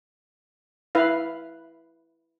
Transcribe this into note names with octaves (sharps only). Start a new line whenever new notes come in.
E4 B4 F5